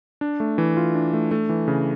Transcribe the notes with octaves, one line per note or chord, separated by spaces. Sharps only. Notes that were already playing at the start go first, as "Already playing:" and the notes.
D4
A3
E3
F4
D4
A3
A3
E3
C#3